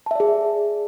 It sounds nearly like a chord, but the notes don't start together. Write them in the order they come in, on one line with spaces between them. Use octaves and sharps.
A5 E5 D5 G#4